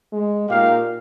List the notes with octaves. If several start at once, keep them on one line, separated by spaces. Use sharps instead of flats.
G#3
A#2 D#4 G4 A#4 F5